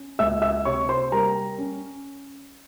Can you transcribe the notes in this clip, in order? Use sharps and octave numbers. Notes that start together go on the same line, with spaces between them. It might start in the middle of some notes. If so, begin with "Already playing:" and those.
Already playing: C#4
C#2 E5 E6
E5 E6
C3 C#5 C#6
C5 C6
G3 A#4 A#5
C#4